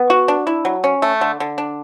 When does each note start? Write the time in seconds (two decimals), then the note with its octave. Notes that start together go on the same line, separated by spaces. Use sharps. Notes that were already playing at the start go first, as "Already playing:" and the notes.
Already playing: B3
0.10 F#4
0.28 D4
0.47 E4
0.65 F#3
0.84 C#4
1.02 A3
1.21 D3
1.40 D3
1.58 D4